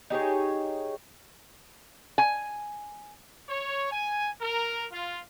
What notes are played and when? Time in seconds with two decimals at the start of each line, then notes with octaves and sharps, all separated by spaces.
0.10 D#4 G4 G#4 C#5
2.18 G#5
3.49 C#5
3.92 G#5
4.41 A#4
4.92 F4